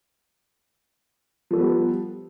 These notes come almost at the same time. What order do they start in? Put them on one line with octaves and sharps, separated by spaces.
F3 A4 B3 B4 G3